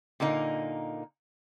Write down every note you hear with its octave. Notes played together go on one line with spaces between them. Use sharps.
A#2 D3 A#3 D#4